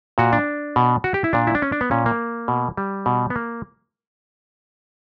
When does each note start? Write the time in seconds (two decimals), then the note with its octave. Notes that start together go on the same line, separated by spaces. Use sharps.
0.18 A#2 F#4
0.33 D4
0.76 B2
1.04 F#4
1.14 G4
1.24 E4
1.33 A#2 D4
1.47 E4
1.55 D4
1.62 C#4
1.72 D4
1.81 B3
1.91 A#2 C#4
2.06 A#3
2.48 B2
2.77 G3
3.06 B2
3.30 B3
3.36 A#3